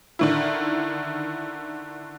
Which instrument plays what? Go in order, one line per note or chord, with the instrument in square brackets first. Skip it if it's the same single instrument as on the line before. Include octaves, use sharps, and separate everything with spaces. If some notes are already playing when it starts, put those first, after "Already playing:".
[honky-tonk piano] D3 D#3 E4